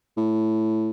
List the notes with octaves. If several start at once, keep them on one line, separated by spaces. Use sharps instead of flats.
A2